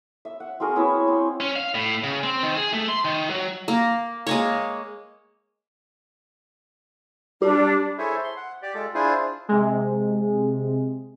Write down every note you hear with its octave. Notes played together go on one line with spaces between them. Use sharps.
E5
F#5
C4 F#4 G#4 A#4
B3 E4 C#5
C4
C#4
F5
A2
C#3
C4
D#3
G#4
A3
C6
D#3
F#3
A#3
G#3 A#3 C#5
G3 D4 G4
E4 G#4 A4 C5 C#5 E5
C6
F#5
G4 D5
G#3 F4 A4
D4 E4 F4 G#4 C5
C3 G#3